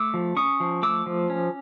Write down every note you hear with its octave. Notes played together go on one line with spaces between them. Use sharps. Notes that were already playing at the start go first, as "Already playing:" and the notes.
Already playing: A3 D6 E6
F3
C#4 C#6 D#6
F3
A3 D6 E6
F3
C#4